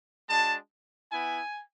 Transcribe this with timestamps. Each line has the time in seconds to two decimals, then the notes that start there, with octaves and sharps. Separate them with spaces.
0.29 G#3 D4 F#4 A5
1.12 B3 E4 G#5